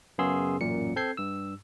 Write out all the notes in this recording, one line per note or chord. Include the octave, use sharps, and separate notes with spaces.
F#2 C#3 B3 G#4 C6 E6
A1 F#2 A#2 C#7
C4 A4 G6 G#6 C7
G2 E6